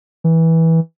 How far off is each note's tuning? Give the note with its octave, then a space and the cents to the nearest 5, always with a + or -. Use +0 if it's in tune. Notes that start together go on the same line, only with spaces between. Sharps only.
E3 -15